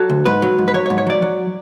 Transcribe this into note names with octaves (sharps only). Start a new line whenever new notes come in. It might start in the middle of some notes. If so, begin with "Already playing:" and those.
Already playing: F#3 A4
D2
G#2 B4
F#3
G#2
B4
F#3 C#5
C#5
G#2
C#5
F#3 D5
F#3